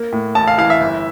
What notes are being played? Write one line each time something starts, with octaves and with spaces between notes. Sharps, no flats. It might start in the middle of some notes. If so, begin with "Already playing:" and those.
Already playing: A#3
A2
A1 A5
F5
E3 F5
E5
G1